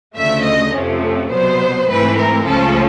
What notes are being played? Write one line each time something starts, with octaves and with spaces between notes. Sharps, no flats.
D2 C#3 F3 A3 E5
D#5
F2 C3 F3 A3 C#4
C2 B2 F#3 B3 C5
G#2 E3 A3 C4 B4
A#4
C#2 C#3 F3 A3 C#4 A4